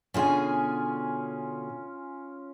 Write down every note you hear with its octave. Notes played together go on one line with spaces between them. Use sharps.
B2 D3 C#4 F4 G#4 G#5